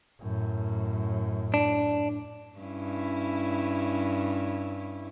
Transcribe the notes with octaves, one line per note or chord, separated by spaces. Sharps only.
F#2 A2
D4
G2 C#4 E4